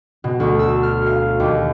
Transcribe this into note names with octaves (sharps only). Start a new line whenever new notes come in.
B2
D2
E6
F6
F5
D#2